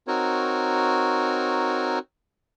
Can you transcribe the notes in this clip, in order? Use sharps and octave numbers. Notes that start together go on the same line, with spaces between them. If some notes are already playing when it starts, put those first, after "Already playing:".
C4 D#4 F#4 A#4 C#5